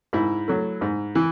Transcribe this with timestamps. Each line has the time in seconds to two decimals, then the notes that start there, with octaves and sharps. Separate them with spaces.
0.13 G#2 E4
0.48 F#3 A3
0.81 G#2
1.15 E3